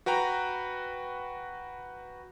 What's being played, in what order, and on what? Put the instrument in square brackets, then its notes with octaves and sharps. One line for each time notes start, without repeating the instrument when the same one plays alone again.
[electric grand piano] F#4 B4 G5 A#5